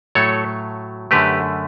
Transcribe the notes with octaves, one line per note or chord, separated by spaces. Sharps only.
A2 F#3 A3 A4 C#5
F#2 D3 A3 G4 B4